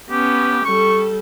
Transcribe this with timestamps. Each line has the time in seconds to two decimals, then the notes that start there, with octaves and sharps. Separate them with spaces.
0.10 B3 C#4 G4
0.65 G3 A4 C#6